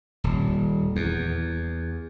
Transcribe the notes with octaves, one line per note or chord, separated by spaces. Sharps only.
D#1
E2